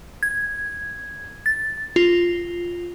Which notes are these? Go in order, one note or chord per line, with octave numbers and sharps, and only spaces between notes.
G#6
A6
F4